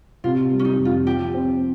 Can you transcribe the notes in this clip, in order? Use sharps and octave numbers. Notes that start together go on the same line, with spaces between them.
C3 F4
G3
C#4
D#4
F2
F4
F3 G4
C4